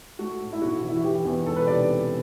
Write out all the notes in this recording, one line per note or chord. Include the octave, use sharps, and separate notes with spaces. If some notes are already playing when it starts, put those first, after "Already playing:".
A3 F#4
A2
E4
B1 F#4
E3
E4
F#4
E3 G4
E2
E1 A4
B4
C3 D5